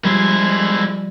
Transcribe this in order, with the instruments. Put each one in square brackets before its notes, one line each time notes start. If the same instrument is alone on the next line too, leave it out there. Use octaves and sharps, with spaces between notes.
[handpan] F3 G3 [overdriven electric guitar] G#3 E4